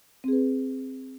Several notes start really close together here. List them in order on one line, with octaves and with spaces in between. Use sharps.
C4 G#4 B4